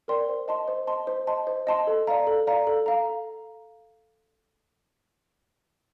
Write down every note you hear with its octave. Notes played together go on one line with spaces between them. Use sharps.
A#4 D5 G5 C6
C5
D#5 A5 C6
C5
D#5 A5 C6
C5
D#5 A5 C6
C5
D#5 A5 C6
A4
D5 F5 A#5
A4
D5 F5 A#5
A4
F5 A#5